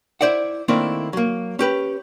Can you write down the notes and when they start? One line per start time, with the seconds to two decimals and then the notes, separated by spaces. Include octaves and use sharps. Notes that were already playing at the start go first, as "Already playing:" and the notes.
0.21 E4 C5 D5 E5 F#5
0.68 D#3 A3 A#3 C4 D4 E4
1.13 F#3 A#3
1.59 C#4 G4 B4